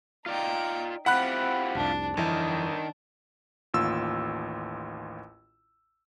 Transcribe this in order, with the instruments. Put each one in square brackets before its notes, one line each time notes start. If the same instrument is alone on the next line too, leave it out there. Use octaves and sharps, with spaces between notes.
[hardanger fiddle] D#4 G5 [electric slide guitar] F4 D5
[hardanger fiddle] C4 [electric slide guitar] E4 F4 G4 [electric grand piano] F#5 B5 F#6
[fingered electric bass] F1 C2 [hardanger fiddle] D4
[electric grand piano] G1 [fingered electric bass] F2 E3 [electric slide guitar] D#3 D#4 [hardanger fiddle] D4
[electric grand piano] A1 D#2 F4 E6